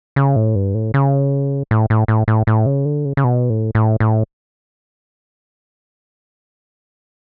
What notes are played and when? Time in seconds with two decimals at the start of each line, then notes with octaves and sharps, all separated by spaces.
0.16 C#3
0.36 A2
0.56 G2
0.75 A2
0.94 C#3
1.71 A2
1.90 A2
2.08 A2
2.28 A2
2.47 A2
2.66 C#3
2.85 D3
3.05 C#3
3.17 C#3
3.24 B2
3.50 A2
3.75 A2
4.00 A2